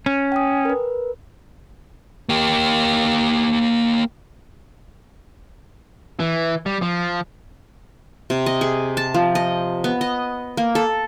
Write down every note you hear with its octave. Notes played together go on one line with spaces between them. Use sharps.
C#4
G5 G#5 D#6
A#4 B4
A#3 G4
E3
G3
F3
C3
D#5
G#4
A5
F3
D#5
B3
D#5
A#3
A4